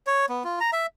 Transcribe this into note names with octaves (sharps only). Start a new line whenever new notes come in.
C#5
B3
F4
A#5
E5